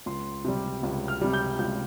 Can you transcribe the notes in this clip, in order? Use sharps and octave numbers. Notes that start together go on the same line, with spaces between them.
C#2 C6
C3 G3
C#2
F6
C3 G3
G6
C#2 G6